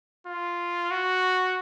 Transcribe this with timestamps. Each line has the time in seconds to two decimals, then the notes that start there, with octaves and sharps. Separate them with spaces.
0.27 F4
0.91 F#4